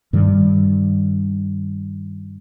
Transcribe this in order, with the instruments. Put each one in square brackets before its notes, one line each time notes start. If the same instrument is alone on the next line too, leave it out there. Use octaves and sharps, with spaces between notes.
[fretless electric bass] G2 D#3 G3